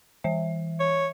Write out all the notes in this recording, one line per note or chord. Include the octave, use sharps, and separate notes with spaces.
E3 E5
C#5